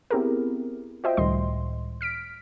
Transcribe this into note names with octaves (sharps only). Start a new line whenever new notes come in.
B3 C4 E4 G4 G#4 A#4
F4 F#4 C5 D#5 E5 G5
C#2 A2 D#3 G3 D#5 C6
F6 B6 D7